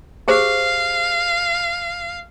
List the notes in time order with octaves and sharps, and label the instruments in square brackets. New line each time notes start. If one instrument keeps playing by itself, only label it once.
[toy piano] G4 G#4 C5 [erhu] F5